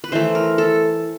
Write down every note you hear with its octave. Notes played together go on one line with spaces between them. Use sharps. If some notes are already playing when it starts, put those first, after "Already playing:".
B4
E3 A3 C5
A#4
A4